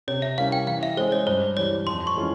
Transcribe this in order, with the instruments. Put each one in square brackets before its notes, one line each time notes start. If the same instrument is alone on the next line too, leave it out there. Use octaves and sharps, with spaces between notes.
[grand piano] C3 [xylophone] C#5
[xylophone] E5
[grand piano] G3 C#4 E4 A#4 [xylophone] F5
[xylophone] G5
[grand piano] E3 [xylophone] F5
[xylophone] E5
[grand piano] G#3 C#4 E4 G#4 [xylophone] C5
[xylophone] C#5
[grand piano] G2 [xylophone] C5
[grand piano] E3 G3 [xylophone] C#5
[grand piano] F2 [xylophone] C6
[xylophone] C#6
[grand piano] E3 G#3 C#4 F4